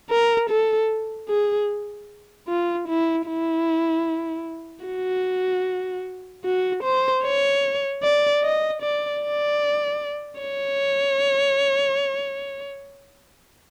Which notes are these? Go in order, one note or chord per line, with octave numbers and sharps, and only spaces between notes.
A#4
A4
G#4
F4
E4
E4
F#4
F#4
C5
C#5
D5
D#5
D5
D5
C#5